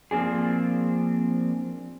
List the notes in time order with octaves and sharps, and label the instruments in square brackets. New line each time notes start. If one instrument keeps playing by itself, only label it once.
[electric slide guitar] F3 A#3 C4 D4 G#4